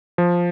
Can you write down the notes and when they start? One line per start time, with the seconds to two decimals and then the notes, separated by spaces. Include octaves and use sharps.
0.18 F3